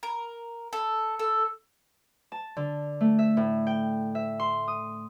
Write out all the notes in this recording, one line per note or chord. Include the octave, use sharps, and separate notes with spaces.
A#4
A4
A4
A5
D3
A3
E5
A2
G5
E5
C6
D#6